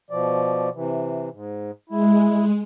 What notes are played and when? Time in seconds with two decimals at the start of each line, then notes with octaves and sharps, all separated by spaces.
0.10 B2 F3 D5
0.73 C3 E3
1.32 G#2
1.89 G#3 E4